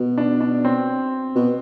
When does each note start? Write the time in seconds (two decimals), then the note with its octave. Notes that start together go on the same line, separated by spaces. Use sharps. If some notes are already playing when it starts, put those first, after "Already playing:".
Already playing: B2
0.18 D4
0.41 D4
0.65 C4
1.35 B2